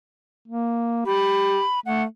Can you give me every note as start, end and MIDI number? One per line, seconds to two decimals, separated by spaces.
0.48 1.06 58
1.06 1.63 67
1.06 1.80 83
1.86 2.05 57
1.86 2.03 78